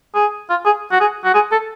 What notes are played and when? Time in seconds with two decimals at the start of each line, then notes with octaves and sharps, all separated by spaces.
0.15 G#4
0.50 F4
0.66 G#4
0.92 F#4
1.01 G#4
1.25 F#4
1.34 G#4
1.52 A4